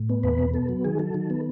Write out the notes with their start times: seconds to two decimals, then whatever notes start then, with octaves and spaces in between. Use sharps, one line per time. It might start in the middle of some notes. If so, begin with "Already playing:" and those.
Already playing: A2
0.09 B3
0.23 E2 B4
0.39 B2
0.54 B3 A4
0.69 F#3
0.84 D#3 G#4
0.99 F#3 A4
1.14 D#3
1.30 B3